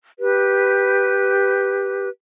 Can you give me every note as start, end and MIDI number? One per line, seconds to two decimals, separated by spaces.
0.18 2.08 67
0.18 2.08 71